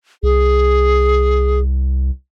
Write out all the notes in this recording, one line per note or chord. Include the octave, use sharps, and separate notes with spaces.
C2 G#4